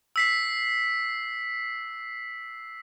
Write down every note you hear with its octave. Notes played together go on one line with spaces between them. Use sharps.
E6 B6 C7